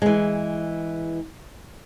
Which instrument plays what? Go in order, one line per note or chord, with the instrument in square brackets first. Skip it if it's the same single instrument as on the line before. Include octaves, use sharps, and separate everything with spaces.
[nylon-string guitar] E3 G#3